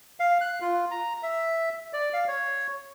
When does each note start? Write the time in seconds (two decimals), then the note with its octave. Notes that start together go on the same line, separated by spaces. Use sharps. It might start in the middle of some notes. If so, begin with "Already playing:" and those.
0.20 F5
0.41 F#6
0.62 F4
0.91 A#5
1.23 E5
1.93 D5
2.13 F5
2.28 C#5